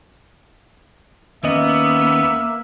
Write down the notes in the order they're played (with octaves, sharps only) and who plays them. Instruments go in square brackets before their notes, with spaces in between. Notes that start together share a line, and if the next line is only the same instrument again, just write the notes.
[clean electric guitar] D#2 C#4 D#5 [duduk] A#3 [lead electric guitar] B3 [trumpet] E5